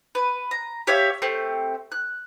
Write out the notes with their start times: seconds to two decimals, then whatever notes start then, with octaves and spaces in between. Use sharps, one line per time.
0.15 B4
0.51 A#5
0.87 G4 C#5 E5 F5
1.22 A3 C4 G4
1.92 F#6